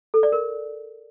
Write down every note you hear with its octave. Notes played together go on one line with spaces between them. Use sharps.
A4
D5
A#4